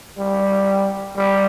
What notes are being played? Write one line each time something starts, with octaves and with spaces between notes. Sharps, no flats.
G3
G3